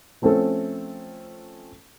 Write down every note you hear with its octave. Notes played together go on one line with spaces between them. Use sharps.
F3 A3 C4 C#4 A4